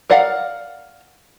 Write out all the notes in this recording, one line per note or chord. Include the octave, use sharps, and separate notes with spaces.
A#4 D5 F5 F#5